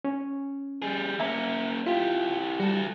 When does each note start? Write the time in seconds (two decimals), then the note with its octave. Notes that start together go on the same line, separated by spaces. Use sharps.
0.05 C#4
0.82 G3 G#4
1.20 A#3 C#4 E5 A#5
1.87 E4 F4 G4
2.60 G3 F#4 A4